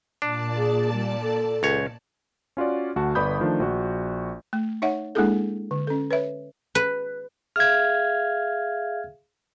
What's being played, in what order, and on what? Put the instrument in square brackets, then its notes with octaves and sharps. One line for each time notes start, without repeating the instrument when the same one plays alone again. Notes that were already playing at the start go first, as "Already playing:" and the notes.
[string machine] A#2 D5 A5 [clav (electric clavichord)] D4
[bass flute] G#4
G3
A4
[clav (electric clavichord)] C#2 C#5
[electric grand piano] C#4 F4 F#4 D5
D2 F#4 A5
G1 B4 D5 B5 D#6 G6
D#3 F3 A3 D4
A#1 F#4
[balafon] A3
D#4 C#5 E5 F#5
G#3 A#3 D4 E4 G#4 A4
D3
C#4 A4
B4 C#5 E5
[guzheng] B4
[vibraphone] G#4 E5 F5 [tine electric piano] F6 G#6